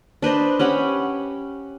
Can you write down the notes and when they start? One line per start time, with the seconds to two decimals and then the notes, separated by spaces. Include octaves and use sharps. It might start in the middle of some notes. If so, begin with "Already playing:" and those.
0.22 D4 B4 C5 D#5
0.59 C#4 G4 F#5 B5